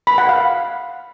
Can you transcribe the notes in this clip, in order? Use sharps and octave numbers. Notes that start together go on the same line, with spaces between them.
B5
F#5
F5